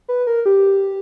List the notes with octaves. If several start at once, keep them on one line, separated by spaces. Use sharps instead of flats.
B4
A#4
G4